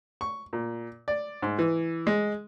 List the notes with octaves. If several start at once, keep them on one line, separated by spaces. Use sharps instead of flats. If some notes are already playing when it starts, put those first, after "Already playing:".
C#6
A#2
D5
G#2
E3
G#3